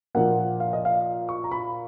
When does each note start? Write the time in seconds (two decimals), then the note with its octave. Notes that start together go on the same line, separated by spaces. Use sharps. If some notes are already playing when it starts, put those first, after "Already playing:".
0.15 A#2 F3 A#3 F#5
0.60 F5
0.73 D#5
0.85 F5
1.29 C#6
1.44 A#5
1.51 B5